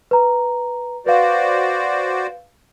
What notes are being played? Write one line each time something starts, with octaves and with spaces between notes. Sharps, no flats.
B4 A#5
F#4 B4 C5 D5 F5